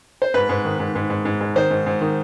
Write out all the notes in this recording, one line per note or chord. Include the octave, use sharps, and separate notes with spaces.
C5
G#2 B4
G#2
D#3
G#2
G#2
G#2
G#2
G#2
D#3 C5
G#2
G#2
D#3